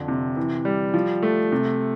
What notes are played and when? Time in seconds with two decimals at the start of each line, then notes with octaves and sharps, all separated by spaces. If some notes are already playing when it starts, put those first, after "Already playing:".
Already playing: F2 D3
0.08 C3
0.36 E3
0.65 G3
0.94 F3
1.23 A3
1.52 C3